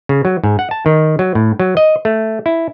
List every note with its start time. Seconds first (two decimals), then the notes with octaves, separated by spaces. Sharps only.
0.09 C#3
0.25 F#3
0.44 G#2
0.59 F#5
0.71 A5
0.86 D#3
1.19 F#3
1.35 A2
1.60 F#3
1.77 D#5
2.05 A3
2.46 E4